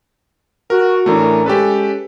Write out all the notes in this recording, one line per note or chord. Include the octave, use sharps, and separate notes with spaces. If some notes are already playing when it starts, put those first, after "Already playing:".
F#4 A#4
A2 E3 A3 C#4 D4 A#4
G#3 C#4 G4 A4 B4